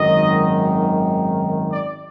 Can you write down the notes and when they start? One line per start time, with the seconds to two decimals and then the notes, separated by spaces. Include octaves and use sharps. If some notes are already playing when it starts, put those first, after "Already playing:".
Already playing: G#1 F#2 D#3 F#3 D#5
1.70 D5